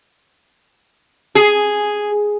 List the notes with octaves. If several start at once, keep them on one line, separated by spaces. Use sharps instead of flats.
G#4